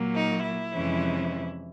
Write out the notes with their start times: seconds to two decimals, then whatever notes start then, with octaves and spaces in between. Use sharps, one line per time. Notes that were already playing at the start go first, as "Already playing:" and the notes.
Already playing: A#2 F#3 A#3
0.15 D#4
0.44 E4
0.72 F2 C3 E3 G#3 C#4